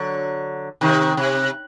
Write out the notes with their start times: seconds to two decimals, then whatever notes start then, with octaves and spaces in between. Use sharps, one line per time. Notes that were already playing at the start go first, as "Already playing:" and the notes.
Already playing: D3 F#3
0.81 C3 D#3
1.17 C3